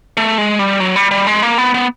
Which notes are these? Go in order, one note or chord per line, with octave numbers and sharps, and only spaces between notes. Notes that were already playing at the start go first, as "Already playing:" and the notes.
A3
G#3
G3
F#3
G3
G3
G#3
A#3
B3
B3